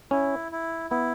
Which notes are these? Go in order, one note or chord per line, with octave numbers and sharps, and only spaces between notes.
C#4 E4
E4
B3 E4